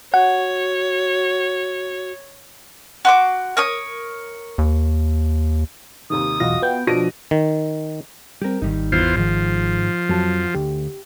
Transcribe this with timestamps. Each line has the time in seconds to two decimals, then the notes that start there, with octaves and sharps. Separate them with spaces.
0.14 F#4 C#5 F#5
3.05 F#4 C6 D6
3.57 A#4 C#5 D#6
4.58 D#2
6.10 D#2 C3 D#3 D#6
6.40 B1 E2 F4 F#4 D#5 A#6
6.62 B3 G5
6.87 B2 F3 D4 A#6 D7 D#7
7.31 D#3
8.42 G3 C4 G4 A#4
8.62 G#1 D#3 G3 D#4
8.92 E2 F4 C5
9.17 G#2 D#3 F3
10.09 F2 F#3 F#4 A5
10.54 D2 G4